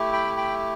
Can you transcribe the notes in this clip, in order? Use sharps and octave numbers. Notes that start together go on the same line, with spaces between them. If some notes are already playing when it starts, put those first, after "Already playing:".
Already playing: A3 E4 G4
G5 B5
G5 B5